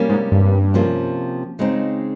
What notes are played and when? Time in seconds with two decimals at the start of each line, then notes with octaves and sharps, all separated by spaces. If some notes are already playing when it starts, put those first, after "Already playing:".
Already playing: C3 G3 A#3 C#4
0.09 G#2
0.32 G2
0.74 C3 F3 A#3 C#4
1.59 C#3 G#3 C4 D#4